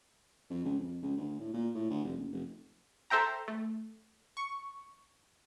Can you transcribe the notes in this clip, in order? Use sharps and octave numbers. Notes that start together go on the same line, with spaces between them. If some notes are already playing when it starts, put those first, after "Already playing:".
F2
C#2
F2
C#2
D2
A2
A#2
A2
D2
F1
F#1
F1
A4 C5 E5 G5 A#5
A3
C#6